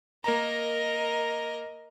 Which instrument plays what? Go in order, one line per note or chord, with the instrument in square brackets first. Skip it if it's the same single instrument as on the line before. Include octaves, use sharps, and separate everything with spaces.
[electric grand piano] A#3 A#5 [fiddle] A#4 D#5